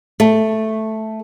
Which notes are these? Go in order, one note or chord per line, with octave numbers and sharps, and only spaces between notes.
A3